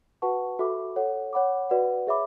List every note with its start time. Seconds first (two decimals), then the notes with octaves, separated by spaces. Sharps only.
0.22 F#4 B4 F#5 A5 C#6
0.59 F#4 A4 E5 B5 D6
0.96 A4 C#5 F#5
1.33 C#5 F#5 B5 D6
1.70 F#4 B4 D5 F#5
2.07 G#4 C#5 E5 B5 D6